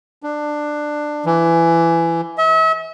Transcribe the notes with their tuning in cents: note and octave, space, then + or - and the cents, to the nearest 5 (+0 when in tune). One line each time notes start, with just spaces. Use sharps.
D4 +15
E3 +20
E5 -40